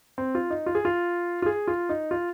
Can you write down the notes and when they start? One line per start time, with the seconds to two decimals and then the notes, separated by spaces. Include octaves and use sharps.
0.18 C4
0.35 F4
0.50 D#4
0.66 F4
0.75 G#4
0.85 F4
1.42 F4
1.46 G#4
1.68 F4
1.89 D#4
2.11 F4